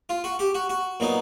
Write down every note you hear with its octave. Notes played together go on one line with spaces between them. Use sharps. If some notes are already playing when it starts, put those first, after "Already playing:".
F4
F#4
G4
F#4
F#4
A#2 F#3 B3 D#4